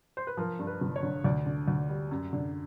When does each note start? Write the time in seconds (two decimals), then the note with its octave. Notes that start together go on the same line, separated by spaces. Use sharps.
0.17 C5
0.27 B4
0.37 F3 A#4
0.59 G2
0.67 B4
0.81 G1
0.96 C#5
1.03 D3
1.24 D2 D5
1.46 D3
1.68 D2
1.90 G3
2.11 F#2
2.33 D3